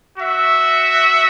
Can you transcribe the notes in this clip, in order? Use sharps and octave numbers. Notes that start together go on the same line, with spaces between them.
F#4 E5